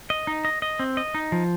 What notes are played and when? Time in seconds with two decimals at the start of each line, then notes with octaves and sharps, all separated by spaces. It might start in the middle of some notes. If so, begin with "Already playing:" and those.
0.10 D#5
0.27 D#4
0.45 D#5
0.62 D#5
0.79 C4
0.97 D#5
1.15 D#4
1.32 F3